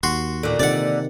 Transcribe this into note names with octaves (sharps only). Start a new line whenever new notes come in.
D#2 F#4 C6
A#2 D3
C3 D#3 D5 F#5